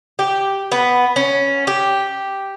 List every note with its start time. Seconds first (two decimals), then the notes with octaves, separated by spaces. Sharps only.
0.19 G4
0.72 B3
1.16 C#4
1.67 G4